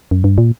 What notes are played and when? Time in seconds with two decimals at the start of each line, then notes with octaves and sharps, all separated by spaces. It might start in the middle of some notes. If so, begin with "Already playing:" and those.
0.11 F#2
0.24 G2
0.38 A#2